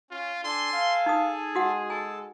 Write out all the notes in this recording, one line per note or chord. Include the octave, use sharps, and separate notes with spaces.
C#4 F4
D4 A4 G#5 A5 C6
F5
D#4 G#4 D#6
G#3 F#4 F#5
A4 G#5 A5